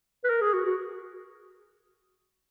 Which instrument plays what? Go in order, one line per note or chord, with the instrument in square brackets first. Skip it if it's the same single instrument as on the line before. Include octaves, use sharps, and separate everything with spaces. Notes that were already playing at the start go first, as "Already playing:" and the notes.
[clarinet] B4
A#4
G#4
F#4
F#4